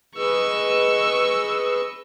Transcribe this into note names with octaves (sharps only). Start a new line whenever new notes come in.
G#4 B4 D#5 C#6 E6